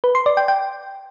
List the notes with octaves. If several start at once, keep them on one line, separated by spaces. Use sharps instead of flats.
B4
C6
D5
G5
G5